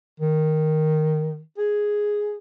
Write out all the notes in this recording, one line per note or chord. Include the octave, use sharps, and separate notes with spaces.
D#3
G#4